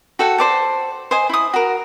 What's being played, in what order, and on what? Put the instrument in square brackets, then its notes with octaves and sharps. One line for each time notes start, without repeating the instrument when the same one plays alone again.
[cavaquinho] F#4 A4 F#5 G5
C5 D5 A5
C5 D#5 G#5
E4 D#6
F#4 A#4